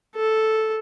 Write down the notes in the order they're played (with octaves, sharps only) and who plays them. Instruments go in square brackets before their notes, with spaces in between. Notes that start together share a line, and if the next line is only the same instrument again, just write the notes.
[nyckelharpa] A4